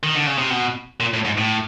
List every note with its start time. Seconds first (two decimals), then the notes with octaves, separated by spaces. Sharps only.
0.03 D#3
0.15 D3
0.27 C#3
0.38 C3
0.50 B2
1.00 A#2
1.13 A2
1.25 G#2
1.38 A2